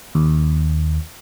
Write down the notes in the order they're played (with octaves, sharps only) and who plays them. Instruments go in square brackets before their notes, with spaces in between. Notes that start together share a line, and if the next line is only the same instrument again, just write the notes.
[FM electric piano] D#2